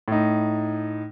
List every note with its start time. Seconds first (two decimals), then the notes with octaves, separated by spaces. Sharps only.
0.08 A2 D#4